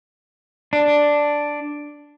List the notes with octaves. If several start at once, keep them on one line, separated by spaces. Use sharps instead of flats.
D4